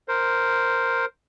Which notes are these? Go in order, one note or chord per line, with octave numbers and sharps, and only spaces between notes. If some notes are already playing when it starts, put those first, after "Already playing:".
A#4 C5